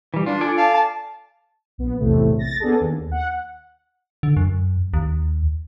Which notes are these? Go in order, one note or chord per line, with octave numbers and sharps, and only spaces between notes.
E3 G3
D4 F4
F4 A4 D5 G#5
F5 A5
A5
A#1 B3
A#1 E2 A2 C3 A3
A6 A#6
B3 D4 G#4 A4
D#2
F#5
D3
F#2
D#2